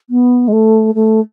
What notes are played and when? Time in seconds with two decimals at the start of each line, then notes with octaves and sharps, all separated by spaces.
0.10 B3
0.48 G#3
0.52 A3
0.95 A3